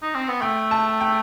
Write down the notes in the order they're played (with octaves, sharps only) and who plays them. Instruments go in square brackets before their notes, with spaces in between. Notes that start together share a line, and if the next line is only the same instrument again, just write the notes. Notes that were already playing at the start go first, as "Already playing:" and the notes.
[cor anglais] D#4
C4
B3
[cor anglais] A3 [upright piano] G5
[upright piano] A5
G5